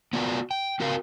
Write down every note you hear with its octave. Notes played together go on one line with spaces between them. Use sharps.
B3 F4 F#4 D5
G5
C4 F#4 A#4 F5